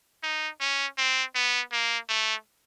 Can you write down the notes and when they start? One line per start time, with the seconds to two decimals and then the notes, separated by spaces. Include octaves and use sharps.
0.23 D#4
0.60 C#4
0.98 C4
1.35 B3
1.72 A#3
2.09 A3